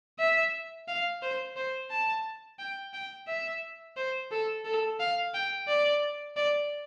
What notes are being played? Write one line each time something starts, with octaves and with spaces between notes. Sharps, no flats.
E5
F5
C5
C5
A5
G5
G5
E5
C5
A4
A4
F5
G5
D5
D5